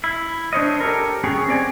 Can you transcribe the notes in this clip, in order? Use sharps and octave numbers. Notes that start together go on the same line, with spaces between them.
E4
D4 C5 C#5 D#5
G4 A4 A#4
B3 C#4 G4 G#4 C#5
C4 D5 G#5